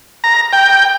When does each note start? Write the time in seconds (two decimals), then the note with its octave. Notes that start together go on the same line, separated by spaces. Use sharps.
0.24 A#5
0.53 G5